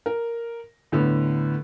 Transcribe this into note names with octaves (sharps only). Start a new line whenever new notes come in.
A#4
A2 D3 B3